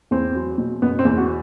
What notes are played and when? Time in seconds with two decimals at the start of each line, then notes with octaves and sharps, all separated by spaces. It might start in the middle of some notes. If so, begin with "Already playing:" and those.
0.11 E2 C4
0.35 F#3
0.58 B2
0.82 F#1 B3
0.99 C4
1.05 E2
1.17 F#4